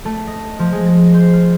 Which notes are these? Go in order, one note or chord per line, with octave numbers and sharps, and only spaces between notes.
A3
D#5
F3
G#3
A#6
C5
F4